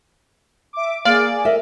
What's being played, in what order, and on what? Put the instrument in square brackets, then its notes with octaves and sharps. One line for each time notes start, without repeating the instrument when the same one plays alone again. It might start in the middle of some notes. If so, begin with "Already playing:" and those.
[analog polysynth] E5 D6
[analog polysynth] A#3 G#4 [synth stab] D5 [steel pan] F5
[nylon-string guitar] A#4 D#5 E5